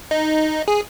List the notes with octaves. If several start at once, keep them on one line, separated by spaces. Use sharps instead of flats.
D#4
G#4